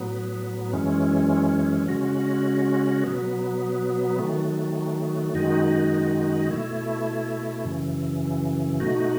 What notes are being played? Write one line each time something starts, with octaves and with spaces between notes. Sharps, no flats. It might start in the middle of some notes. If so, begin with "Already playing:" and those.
Already playing: A2 F#3 B3
F#2 E3 G#3 C#4
C#3 G#3 C#4 F#4
B2 F#3 B3
D#3 F#3 A3
F#2 D#3 G#3 D#4 F#4
B2 A3 E4
F#2 C#3 E3
B2 A3 D#4 F#4